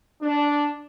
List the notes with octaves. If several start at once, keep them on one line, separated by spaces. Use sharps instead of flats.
D4